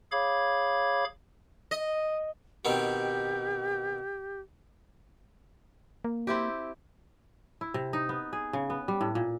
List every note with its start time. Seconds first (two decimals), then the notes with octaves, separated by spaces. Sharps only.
0.12 G#4 C#5 F5 B5 D6 G#6
1.71 D#5
2.65 B2 D#3 C4 G4
6.04 A#3
6.27 C4 E4 G4
7.61 E4
7.74 C3
7.93 D#4
8.09 B3
8.33 G#4
8.53 C#3
8.70 B3
8.88 G3
9.01 A2
9.15 A#2